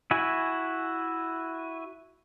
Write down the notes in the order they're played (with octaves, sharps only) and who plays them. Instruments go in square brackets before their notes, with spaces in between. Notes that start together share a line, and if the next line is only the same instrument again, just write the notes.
[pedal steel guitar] E4 F#4 G#5